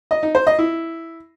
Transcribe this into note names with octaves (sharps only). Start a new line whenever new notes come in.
D#5
D#4
C5
D#5
E4